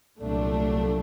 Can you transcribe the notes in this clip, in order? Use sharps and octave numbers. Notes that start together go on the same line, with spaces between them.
C2 A#2 F#3 A3 D4